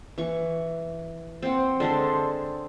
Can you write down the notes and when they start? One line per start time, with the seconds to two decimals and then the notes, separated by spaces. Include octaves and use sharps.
0.18 E3 C#6
1.42 C4 F#5
1.80 D3 G#3 A4 C5